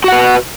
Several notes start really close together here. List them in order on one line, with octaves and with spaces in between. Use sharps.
F#4 F#5 B4